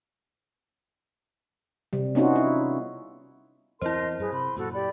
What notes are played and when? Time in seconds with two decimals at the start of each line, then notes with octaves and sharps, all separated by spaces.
1.93 C3 G3
2.15 B3 C#4 D#4 F4 F#4
2.36 E4
3.82 E2 C4 E4 A#4 C5 D#5 C6
4.20 F#2 G#4 B4
4.32 C3 B5 C6
4.56 F#2 A#2 F#4 A4
4.73 G4 D5 B5